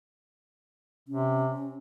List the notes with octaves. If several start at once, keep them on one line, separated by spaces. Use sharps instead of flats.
C3 C#4